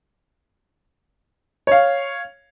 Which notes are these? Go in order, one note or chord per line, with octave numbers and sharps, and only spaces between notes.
C#5 F5